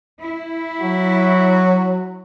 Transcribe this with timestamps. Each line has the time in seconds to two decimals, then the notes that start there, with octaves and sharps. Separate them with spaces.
0.19 E4
0.81 F#3 F#4